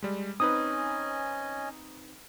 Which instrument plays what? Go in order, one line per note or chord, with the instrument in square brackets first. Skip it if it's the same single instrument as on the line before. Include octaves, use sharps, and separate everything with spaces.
[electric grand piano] G3 G#3
[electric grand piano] C4 D#4 B4 [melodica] C#4 D#5 G#5 [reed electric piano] D#6